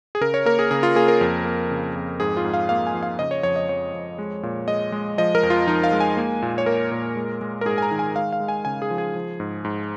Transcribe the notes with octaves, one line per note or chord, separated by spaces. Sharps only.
G#4
C#3 A#4
C#5
A#3 A#4
G#4
C#3 G#4
F4
A#3 G#4
A#4
F2
A#3
C#3
F2
G#2 G#4
F4
G#2
F5
A#3 F5
G#5
F3
F5
C#3 D#5
C#5
F2 C#5
D#5
F2 C#5
F2
G#3
A#2
G#3 D#5
G#3
F3 D#5
A#4
F2
F4
F3 D#4
F5
G#3
G#5
A#3
A#2
C#5
A#3 A#4
A#2
G#3
G#3
A#4
G#2 G#4
G#5
A#5
D#3
G#5
G#3 F5
F5
G#3
G#5
C#3 G#5
G#4
F3
G#4
F3
G#2
G#2